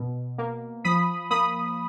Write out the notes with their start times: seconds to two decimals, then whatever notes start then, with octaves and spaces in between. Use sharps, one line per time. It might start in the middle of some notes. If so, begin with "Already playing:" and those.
Already playing: B2
0.38 A#3
0.84 F3 B5 D#6
1.31 A#3 B5 D#6